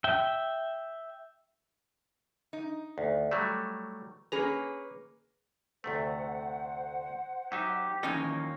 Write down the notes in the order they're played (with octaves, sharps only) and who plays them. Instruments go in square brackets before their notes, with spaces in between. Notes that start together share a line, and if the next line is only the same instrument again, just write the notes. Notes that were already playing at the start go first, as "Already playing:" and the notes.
[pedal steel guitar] E5 G5
[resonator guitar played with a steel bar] D#4
[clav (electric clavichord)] D2
F#3 G3 A3
[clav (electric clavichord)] A#3 A#5 [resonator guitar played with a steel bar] C#4 G#4 B4
[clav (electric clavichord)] D2 C3 A3 [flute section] C5 F#5
[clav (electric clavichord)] F#3 D#4 E5 [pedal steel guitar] G4
[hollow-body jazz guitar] D#2 C#4 D#5 [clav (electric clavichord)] E3 F3 D#4 [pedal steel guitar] A#3 C#5